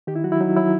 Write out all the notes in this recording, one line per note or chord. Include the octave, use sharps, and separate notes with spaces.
D#3 G4
E4
F#3 F#4
E4
F#3 D#4
F#3 E4